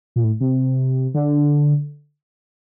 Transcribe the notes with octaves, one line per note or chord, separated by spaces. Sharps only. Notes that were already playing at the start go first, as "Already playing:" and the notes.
A#2
A2
C3
D3